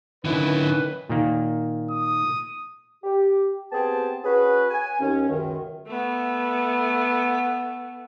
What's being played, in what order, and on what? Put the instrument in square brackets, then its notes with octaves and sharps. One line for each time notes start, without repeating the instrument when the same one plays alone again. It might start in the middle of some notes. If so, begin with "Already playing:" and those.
[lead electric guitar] D3 E4 [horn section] D#3 C#4 B4
[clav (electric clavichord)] A#2 D#3 A#3
[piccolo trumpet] D#6
[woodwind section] G4
B3 C4 G4 G#4 G5 A5
C#4 F#4 G#4 B4
G#5
D#2 C#4
C#2 F#2 D#3
[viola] A3 B3